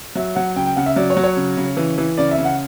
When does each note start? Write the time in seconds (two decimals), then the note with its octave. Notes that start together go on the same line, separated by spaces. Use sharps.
0.15 F#3 E5
0.35 F#3 F#5
0.56 C#3 G5
0.66 G5
0.76 C#3 F#5
0.86 E5
0.96 F#3 D5
1.10 C#5
1.17 F#3
1.24 C#5
1.37 C#3
1.57 C#3
1.77 E3
1.98 E3
2.18 C#3 D5
2.31 E5
2.38 C#3
2.45 F#5